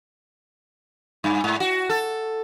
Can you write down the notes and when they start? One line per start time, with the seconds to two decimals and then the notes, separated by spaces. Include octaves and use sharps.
1.24 G2
1.44 G#2
1.60 F#4
1.90 A4